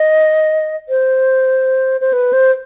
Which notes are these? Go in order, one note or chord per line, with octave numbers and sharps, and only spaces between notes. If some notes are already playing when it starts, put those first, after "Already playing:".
Already playing: D#5
C5
C5
B4
C5